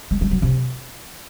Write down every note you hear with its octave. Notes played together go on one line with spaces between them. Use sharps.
G#3
G3
F#3
C3